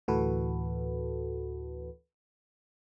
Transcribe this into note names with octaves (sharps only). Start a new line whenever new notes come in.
D2 A2 E3 F#4 A4 B4